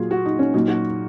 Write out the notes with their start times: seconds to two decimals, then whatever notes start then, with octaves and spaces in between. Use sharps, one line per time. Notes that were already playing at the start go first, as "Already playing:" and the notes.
Already playing: A#2 F#3 F4 G#4
0.11 F#4
0.25 D#4
0.39 C#4
0.54 A#2 F#3 D#4
0.68 F#4